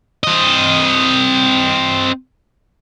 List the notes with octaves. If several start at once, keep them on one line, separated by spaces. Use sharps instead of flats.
C4 D#5